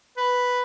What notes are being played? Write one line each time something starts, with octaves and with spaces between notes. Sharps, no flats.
B4